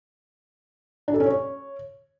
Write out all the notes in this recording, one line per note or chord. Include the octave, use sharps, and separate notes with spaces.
D4
A4
C#4
C#5